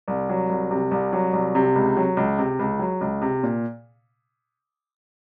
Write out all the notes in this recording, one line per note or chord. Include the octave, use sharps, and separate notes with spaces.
C2
F#3
C2
C3
C2
F#3
C2
C3
C#2
F#3
C#2
C3
C#2
F#3
C#2
C3
A#2